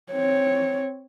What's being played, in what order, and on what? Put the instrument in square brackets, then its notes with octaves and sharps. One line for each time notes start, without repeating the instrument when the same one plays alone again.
[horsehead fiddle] C4 C#5